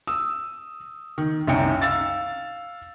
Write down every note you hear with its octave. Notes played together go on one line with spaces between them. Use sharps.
D#6 E6
D#3
C2 F#2 D#4 G5 C#7
F5 E6 A6